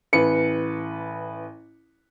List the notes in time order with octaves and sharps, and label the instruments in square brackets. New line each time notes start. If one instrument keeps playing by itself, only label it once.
[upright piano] A1 B4 C#7